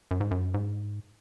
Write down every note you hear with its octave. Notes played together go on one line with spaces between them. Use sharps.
F#2
G#2
F#2
G#2